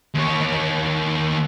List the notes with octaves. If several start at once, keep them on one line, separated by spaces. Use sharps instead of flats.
D#2 C#5